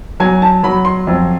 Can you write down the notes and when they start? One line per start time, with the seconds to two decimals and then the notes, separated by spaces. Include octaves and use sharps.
0.20 F#3 G#5
0.42 A5
0.63 F#3 B5
0.85 C6
1.07 F2